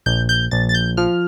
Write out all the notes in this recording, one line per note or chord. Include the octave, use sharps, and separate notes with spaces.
A#1 G6
G6
A#1 A6
A6
G6
F3 F6